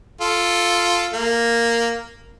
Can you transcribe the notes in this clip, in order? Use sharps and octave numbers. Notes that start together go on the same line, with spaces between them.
F4 A4
A#3